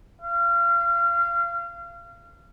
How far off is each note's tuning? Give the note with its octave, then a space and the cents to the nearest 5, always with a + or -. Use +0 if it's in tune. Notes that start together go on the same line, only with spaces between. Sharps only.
F5 -30